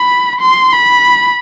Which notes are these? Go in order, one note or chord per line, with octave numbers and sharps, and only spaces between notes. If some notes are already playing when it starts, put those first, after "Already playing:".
Already playing: B5
C6
B5